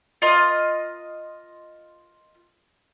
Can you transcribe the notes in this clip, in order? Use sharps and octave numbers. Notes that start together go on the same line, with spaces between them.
F4 A#4 D#5